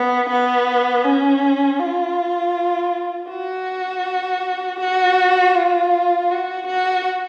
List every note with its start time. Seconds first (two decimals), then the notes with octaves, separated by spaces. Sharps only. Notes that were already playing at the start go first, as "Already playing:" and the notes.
Already playing: B3
0.29 B3
1.05 C#4
1.80 F4
3.29 F#4
4.80 F#4
5.55 F4
6.30 F#4
6.67 F#4